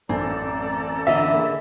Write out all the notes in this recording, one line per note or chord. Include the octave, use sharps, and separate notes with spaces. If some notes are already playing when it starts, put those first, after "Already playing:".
A1 F#2 C4 A4 D5 G#5 A#5
D3 E3 D#5 E5
A#3 G#4